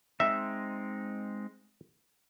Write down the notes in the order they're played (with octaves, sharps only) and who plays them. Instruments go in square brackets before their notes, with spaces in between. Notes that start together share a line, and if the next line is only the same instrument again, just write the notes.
[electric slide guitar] G#3 C4 D#4 [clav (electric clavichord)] E5